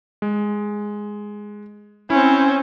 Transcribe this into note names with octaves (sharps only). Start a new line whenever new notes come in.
G#3
C4 C#4 E4